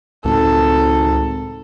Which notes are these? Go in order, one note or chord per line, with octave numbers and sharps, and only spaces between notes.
G#1 C#2 A2 A4